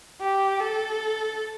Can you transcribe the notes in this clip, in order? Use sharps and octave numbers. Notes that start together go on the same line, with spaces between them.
G4
A4